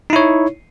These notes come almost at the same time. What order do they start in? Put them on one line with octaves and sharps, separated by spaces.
D#4 E4 C#5